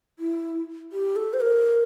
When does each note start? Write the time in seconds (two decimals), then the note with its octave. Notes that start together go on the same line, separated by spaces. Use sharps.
0.19 E4
0.92 G4
1.16 A4
1.33 C5
1.40 A#4